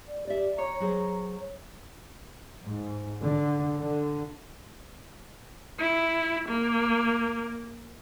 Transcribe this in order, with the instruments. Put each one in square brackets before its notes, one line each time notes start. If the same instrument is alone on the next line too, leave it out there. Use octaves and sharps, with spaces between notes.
[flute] D5
[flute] G4 [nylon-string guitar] D5 E5
[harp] C#5 [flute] A#5
[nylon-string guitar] F#3 G#4 C5
[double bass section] G#2
D3
D3
[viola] E4
A#3